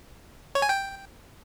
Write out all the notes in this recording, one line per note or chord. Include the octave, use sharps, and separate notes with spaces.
C#5
G#5
G5